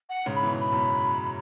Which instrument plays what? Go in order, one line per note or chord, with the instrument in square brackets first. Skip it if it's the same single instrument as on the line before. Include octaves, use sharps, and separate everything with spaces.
[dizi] F#5
[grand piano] G#2 C#3
[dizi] B5
[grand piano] B2 E3
[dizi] B5
[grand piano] F#2 B2